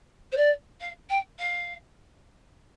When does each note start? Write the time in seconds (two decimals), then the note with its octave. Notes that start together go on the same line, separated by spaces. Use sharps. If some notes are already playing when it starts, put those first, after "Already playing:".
0.32 C5
0.37 D5
0.80 F5
1.09 G5
1.38 F5